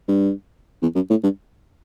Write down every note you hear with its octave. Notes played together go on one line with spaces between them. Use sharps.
G2
E2
F#2
A2
G2